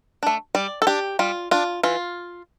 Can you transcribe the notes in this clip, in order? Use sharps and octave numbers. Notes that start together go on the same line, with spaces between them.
A3 D4
G3 D5
A4
D4 G4
G3 F4
D4 F4
E3 F4